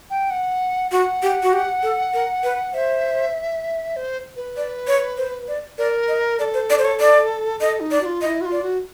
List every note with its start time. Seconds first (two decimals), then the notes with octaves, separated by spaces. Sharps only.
0.10 G5
0.31 F#5
0.92 F#4 F#5
1.23 G4
1.43 F#4
1.53 G4
1.83 A4
2.14 A#4
2.44 B4
2.74 C5 E5
3.96 C5
4.36 B4
4.57 D5
4.87 C#5
5.17 C5
5.48 D5
5.78 A#4 D5
6.08 D#5
6.39 A4 D5
6.54 C5
6.70 D5
6.79 C5
6.85 C#5
7.00 D5
7.61 A4 D#5
7.80 D#4
7.91 D5
8.01 F#4
8.05 F4
8.22 F4 D#5
8.26 E4
8.41 F#4
8.46 F4
8.52 D5
8.62 F#4